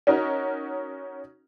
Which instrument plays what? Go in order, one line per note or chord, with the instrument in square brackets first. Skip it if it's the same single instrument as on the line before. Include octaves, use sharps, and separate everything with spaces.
[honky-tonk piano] C#4 D#4 F#4 A#4